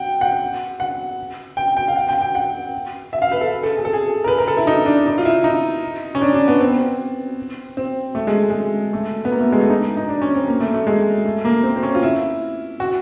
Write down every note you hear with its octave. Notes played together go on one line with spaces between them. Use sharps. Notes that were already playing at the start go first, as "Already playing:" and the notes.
Already playing: F#5 G5
F#5
F#5
G5
G5
F5
F#5
G5
G5
F#5
E5
F5
B4
A4
A4
G#4
A4
G#4
A#4
B4
A#4
A4
E4
D#4
D4
D#4
F4
E4
D#4
C#4
D4
D4
B3
C4
C4
A3
G#3
G#3
A3
B3
A#3
A3
G#3
A3
D#4
D#4
D4
C#4
C4
A#3
A3
A3
G#3
A3
A#3
C4
C4
C#4
F4
E4
F#4